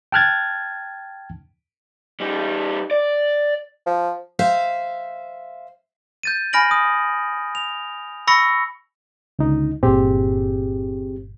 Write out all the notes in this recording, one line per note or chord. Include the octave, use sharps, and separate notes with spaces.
G5 A5 F6 F#6 G#6 A6
G3 D#4
D5
F3
C5 E5 F5
G6 A6 D#7
G#5 B5 F6 A#6 D7 F#7
D#6
F7
B5 C#6 E6 A#6 C#7
C#2 D3 D#4
G1 A#2 C4 G4 G#4